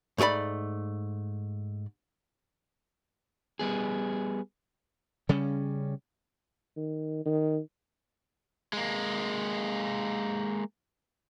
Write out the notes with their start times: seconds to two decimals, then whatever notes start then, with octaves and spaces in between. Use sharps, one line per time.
0.18 G#2 A3 G#4 D5 B5
3.59 G3 B3 G#4
5.29 C#3 G3 C#4
6.76 D#3
7.25 D#3
8.73 G#3 A#3